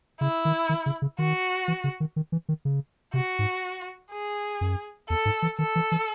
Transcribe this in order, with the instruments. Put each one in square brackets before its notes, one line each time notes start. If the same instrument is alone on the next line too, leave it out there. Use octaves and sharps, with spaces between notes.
[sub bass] C#3 [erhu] E4
[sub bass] D#3
D#3
C#3
C#3
[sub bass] D#3 [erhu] F#4
[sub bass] E3
C#3
D#3
D#3
E3
D#3
C#3
[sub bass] C3 [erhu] F#4
[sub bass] G#2
[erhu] G#4
[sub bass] F#2
[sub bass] E2 [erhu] A4
[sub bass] G#2
E3
[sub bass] D#3 [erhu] A4
[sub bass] E3
E3